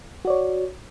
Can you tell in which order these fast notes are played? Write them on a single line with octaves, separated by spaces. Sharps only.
F#4 D5 C#5